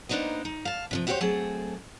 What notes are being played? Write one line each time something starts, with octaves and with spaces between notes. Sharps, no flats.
A#3 B3 D4 D#4 C5 D#5
D#4
F5 A5
C3 E3 F3
E4 F#4 G4 A4 C5 C#5
F#3 A3 C4 G#4 A4